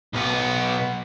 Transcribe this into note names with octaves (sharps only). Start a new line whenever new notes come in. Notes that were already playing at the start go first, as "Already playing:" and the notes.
B1 B3